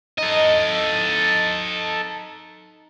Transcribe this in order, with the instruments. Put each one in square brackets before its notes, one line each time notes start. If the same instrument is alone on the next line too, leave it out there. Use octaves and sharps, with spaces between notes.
[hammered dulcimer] D#4 [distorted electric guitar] A4 D#5